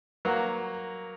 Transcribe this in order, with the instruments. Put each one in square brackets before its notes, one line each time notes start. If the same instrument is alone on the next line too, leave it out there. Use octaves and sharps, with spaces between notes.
[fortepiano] F#3 A#3 [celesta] B4 F#5 A#5 C#6